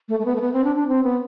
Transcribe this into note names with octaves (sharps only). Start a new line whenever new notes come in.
A3
A3
B3
A3
B3
C4
D4
D4
C4
B3